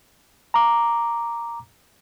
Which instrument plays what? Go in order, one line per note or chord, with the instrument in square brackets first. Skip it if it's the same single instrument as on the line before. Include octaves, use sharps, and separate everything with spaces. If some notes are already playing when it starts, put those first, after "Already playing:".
[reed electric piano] A#5 D6